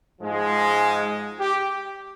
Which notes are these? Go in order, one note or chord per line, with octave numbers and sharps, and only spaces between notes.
G#2 F3 G#3
G4